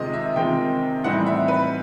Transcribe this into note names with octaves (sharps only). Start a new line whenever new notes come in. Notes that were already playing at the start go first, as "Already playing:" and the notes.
Already playing: C3 D#3 G#3 C4 F4 D#5
E5
C3 D#3 G#3 C4 F4 G5
A2 E3 G3 C4 D#4 F#5
E5
B4